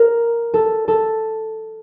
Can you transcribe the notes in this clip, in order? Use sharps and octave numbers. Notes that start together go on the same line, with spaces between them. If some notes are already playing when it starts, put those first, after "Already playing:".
Already playing: A#4
A4
A4